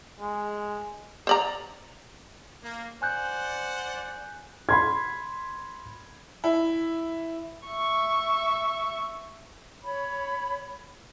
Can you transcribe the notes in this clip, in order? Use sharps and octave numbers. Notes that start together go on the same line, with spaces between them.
G#3
C5 D5 A#5
A#3
C5 D5 F#5 G#5 F#6 G6
B5 C6 G#6
E4
E5 C#6
C#5 B5